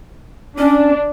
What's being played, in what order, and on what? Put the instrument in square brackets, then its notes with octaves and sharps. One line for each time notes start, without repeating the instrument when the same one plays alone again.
[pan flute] C#4 [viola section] D4